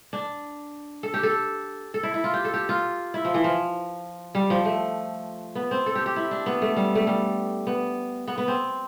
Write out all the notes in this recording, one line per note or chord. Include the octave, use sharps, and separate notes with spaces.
D4
A4
G4
A4
A4
E4
E4
F4
G4
A4
G4
F4
E4
F3
E3
F3
G3
F3
A3
B3
C4
A4
G4
G4
E4
D4
B3
A3
G3
A3
G3
B3
B3
B3
C4